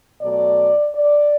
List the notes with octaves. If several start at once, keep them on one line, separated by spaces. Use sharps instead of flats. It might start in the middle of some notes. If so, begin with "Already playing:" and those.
B2 F#3 A3 D5
D5